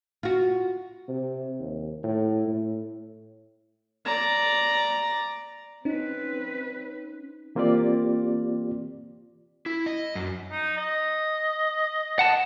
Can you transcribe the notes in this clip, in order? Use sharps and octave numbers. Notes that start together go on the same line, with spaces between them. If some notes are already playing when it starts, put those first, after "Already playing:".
F4 F#4
C3
D#2
A2
A2
D5 A#5
C4 C#4 D#4 B4
E3 A#3 C4 F4 G4 D5
E4
D#5
F#2
D#4
D#5
F#5 A5